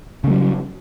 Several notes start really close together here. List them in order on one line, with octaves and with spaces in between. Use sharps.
C#3 A3 F#3 G3